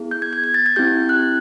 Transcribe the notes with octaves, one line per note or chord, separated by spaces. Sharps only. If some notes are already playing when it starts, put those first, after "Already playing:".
Already playing: B3 E4 G#4
G6
G#6
G#6
G#6
A6
G#6
C4 E4 G4 G6
F#6